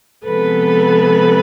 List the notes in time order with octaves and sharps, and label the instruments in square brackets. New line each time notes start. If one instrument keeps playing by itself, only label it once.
[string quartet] C3 F3 G#3 B3 A4 B4